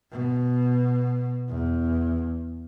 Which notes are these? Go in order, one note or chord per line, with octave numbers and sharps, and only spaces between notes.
B2
E2